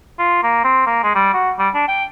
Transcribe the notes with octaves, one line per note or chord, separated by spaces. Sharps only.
F4
A#3
C4
A#3
G#3
G3
F#4
G3
D4
G5